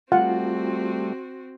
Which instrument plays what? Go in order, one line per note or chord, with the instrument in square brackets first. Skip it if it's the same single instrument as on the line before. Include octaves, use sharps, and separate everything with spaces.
[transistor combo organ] G3 A3 [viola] C4 F#4 [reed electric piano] F4 [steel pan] F#5